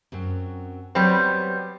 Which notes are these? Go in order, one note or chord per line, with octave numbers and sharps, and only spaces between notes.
F#2 F#3 C4
F#3 G3 B3 C4 C#5